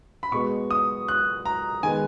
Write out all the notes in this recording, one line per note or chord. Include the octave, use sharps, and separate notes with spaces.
B5
B2 G#3 B3 C#6
D#6
F#6
A#5
D#3 G#3 B3 G#5